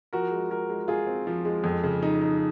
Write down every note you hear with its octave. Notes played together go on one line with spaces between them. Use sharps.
F3 F#4 A#4
G#3
G#3 F#4 A#4
G#3
G#3 F4 G#4
C4
F3
G#3
F2
C#3
D#4
D#4